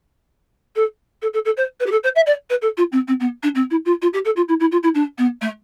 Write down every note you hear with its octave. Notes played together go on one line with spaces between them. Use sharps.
A4
A4
A4
A4
C5
B4
G4
A4
C5
E5
D5
B4
A4
F4
C4
C4
B3
D4
C4
E4
F4
F4
G4
A4
F4
E4
E4
F4
E4
D4
B3
A3